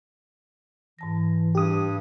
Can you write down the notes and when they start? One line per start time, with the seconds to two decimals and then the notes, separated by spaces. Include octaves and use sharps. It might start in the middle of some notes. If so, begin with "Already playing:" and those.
0.99 G#2 E3 A5 A#6
1.55 G2 G4 D#6